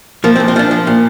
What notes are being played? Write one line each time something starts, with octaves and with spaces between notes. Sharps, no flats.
F3 A#3
C4
A#2
C4
F3 D4
F3
A#2